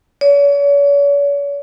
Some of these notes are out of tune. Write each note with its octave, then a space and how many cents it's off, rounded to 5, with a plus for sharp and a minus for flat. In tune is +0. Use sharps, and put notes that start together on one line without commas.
C#5 +40